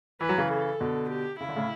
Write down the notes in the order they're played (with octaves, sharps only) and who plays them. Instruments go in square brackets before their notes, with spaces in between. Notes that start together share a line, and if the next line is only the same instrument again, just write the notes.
[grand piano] E3 [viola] B4
[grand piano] F#3
C#3 E3
[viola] A4
[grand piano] B2 D3
[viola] G4
[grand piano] C#3 [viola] E4
[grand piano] D3
A2 C#3